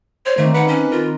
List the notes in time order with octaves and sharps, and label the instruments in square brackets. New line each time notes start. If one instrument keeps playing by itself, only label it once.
[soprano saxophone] C5 [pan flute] C#5
[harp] D#3 A#3 C4 [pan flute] A3
[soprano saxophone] B4 [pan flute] F#5
[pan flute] C#4
[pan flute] F4 [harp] A#4